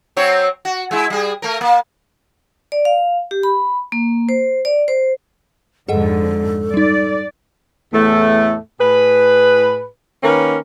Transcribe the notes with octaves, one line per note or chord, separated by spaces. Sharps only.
F#3 C4 C#5
F#4
G#3 E4
G3 G#4
A3 A#4
A#3
D5
F5
G4
B5
A#3
C5
D5
C5
F2 G#2 D3 G#4 A4 D#5 F#5
G3 D#4 D5
E2 A2 A3
A2 G#4 B4
D#3 A#3 C#4 A#4 B4